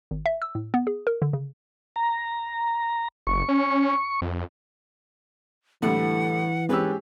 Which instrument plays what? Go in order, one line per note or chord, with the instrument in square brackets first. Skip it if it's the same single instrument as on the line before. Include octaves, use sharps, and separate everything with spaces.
[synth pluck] G#1
E5
E6
A2
B3
G#4
A#4
D3
C#3
[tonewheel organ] A#5
[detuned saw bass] F#1 [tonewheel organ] C#6
[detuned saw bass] C#4
F2
[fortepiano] A2 D3 G3 [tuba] E3 [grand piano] A3 [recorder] F#5
[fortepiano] G#2 C#4 E6 [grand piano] G4 G#4 [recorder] B4